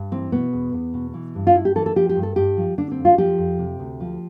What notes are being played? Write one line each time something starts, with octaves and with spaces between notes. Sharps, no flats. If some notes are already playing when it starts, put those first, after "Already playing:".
Already playing: G2
E3 C4
B2 B3
E2
E2
B2
E3
G2
F4
G2 E4
G4
E3 A4
A4
F3 G4
G4
G2
A4
G2 G4
F3
D3 D4
C4
F2
F4
F3 G4
F2
C3
D2
F3